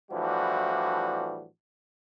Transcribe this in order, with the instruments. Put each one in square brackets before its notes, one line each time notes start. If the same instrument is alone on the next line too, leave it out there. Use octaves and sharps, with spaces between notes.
[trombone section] A2 E3 F3 G3 D4 F#4